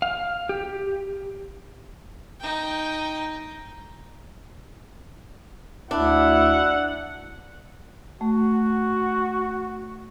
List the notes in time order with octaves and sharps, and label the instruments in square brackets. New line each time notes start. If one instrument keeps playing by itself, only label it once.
[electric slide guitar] F5
G4
[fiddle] D#4 G5
[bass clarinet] D2 [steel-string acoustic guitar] D4 [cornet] E4 [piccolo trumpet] F#5
[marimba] A3 [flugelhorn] F#4